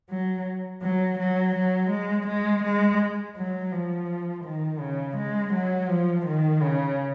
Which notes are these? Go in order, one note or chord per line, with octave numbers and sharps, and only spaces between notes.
F#3
F#3
F#3
F#3
G#3
G#3
G#3
F#3
F3
D#3
C#3
G#3
F#3
F3
D#3
C#3